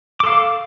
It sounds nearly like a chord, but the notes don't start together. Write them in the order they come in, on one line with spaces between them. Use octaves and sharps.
D6 A4 F5